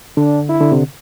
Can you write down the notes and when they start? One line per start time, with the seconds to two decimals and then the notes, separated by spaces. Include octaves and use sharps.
0.17 D3 D4
0.49 E4
0.61 D3
0.72 C3